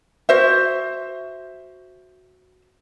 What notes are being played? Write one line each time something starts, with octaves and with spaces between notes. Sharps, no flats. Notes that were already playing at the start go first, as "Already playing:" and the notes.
F#4 C5 E5